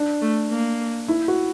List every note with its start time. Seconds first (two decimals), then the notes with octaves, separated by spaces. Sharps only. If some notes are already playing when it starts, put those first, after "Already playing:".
Already playing: D4
0.22 A3
0.50 A#3
1.08 E4
1.28 F#4